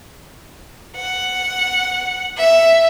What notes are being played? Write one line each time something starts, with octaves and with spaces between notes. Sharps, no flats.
F#5
E5